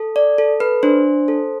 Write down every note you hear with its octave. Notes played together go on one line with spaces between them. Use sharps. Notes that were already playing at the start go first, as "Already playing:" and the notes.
Already playing: A4
D5
A4
B4
D4 C5
A4